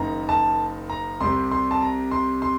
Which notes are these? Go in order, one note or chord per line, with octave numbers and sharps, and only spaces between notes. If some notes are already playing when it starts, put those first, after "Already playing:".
Already playing: F#1 F#2 D#3 A#5
A5
A#5
C2 C3 G3 C6
C6
A5
A#5
C6
C6